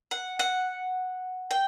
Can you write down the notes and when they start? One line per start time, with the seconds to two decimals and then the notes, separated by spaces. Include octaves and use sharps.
0.11 F#5
0.39 F#5
1.51 G5